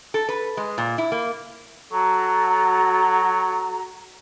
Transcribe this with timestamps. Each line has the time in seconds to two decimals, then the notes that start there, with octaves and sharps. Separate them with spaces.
0.14 A4
0.29 B4
0.57 G#3
0.78 A#2
0.98 E4
1.12 A#3
1.92 F#3 F#4 A4 A#5